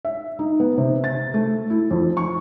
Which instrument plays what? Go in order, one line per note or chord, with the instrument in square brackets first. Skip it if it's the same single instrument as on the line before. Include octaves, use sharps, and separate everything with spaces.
[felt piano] E5
D#4
B3
C3
A6
A3
E4
F2
C#6